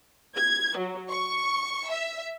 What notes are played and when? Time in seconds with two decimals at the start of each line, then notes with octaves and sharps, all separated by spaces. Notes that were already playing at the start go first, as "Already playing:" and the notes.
0.35 G#6
0.77 F#3
1.09 C#6
1.90 E5